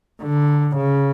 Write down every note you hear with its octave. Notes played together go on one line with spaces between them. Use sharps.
D3
C#3